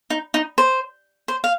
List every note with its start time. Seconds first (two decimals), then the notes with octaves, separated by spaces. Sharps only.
0.10 D#4
0.34 D#4
0.58 C5
1.28 C5
1.44 F5